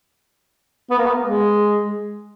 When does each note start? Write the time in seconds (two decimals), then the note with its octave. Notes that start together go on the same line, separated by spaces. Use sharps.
0.90 B3
0.98 A#3
1.06 B3
1.24 G#3